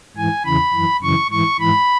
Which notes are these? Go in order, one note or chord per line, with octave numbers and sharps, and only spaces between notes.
G#2 E3 G#5
E2 C#3 E3 B5
F#2 E3
F#2 C#3 E3 C#6
G#2 E3 C#6
G#2 E3 B5